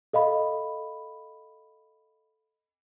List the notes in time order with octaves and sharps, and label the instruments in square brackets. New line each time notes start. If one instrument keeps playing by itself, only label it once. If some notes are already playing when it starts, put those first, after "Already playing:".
[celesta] A4 D#5 F5 B5